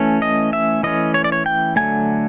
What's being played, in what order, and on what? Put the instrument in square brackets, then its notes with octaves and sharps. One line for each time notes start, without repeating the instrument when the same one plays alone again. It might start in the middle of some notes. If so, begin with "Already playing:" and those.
Already playing: [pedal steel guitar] E3 A3 C#4
D#5
E5
E3 A3 C#4 D#5
C#5
D5
C#5
G5
D3 F#3 A3 G#5